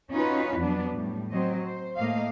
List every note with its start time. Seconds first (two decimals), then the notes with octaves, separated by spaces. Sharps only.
0.11 C#4 D#4 F4 F#4 B4
0.58 F2 F#3 B3 D4
0.94 A2 G3
1.31 F#3 C4 C5 D#5
1.65 C5
1.98 A2 A3 A#3 D#5 F5